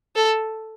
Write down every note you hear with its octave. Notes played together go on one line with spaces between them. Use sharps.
A4